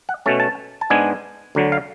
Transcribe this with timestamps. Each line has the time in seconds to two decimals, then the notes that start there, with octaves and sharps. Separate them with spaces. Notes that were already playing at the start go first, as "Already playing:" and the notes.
0.09 F#5
0.26 B2 A3 C#4 A5
0.40 A5
0.81 A5
0.90 G#2 G#3 B3 D4 G#5
1.55 D2 D3 F#3
1.72 F5